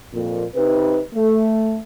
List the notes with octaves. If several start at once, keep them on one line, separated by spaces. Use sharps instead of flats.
F2 A#2
C3 D#4 B4
A3